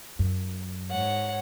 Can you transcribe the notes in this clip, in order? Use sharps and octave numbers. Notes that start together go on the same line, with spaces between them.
F#2
G#2 C#5 F#5